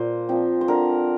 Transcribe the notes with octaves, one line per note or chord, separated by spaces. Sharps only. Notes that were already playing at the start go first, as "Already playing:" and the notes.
Already playing: A#2 C5
F3 C4
C5
D3 A#4